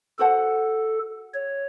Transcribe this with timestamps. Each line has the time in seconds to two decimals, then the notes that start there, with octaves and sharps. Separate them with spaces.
0.19 F#4 A4 C5 F#5 A5
1.34 C#5